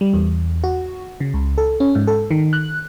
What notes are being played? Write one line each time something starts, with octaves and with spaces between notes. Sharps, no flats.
G3
E2
F#4
C#3
C#2
A4
C#4
G#2
A4
D#3
F#6